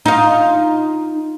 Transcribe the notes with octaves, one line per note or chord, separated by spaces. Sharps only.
D#4 F4